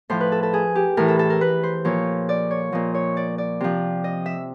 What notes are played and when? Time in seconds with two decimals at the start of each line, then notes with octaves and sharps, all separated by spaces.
0.10 A2 F3 C5
0.20 B4
0.32 A4
0.43 A4
0.53 G#4
0.75 G4
0.97 A2 E3 A#4
1.08 A4
1.19 A4
1.30 A#4
1.41 B4
1.63 C5
1.85 A#2 F3 C#5
2.29 D5
2.51 C#5
2.72 A#2 F3 D#5
2.95 C#5
3.17 D5
3.38 D5
3.60 C3 F3
4.04 D#5
4.26 E5